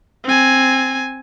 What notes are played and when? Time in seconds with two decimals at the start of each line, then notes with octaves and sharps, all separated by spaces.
0.24 C4 G#5